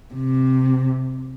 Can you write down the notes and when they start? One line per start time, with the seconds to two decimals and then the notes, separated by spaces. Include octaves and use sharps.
0.14 C3